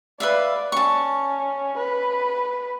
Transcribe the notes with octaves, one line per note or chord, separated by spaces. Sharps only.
B4 D5 E5 F5
C#4 A5 C#6
B4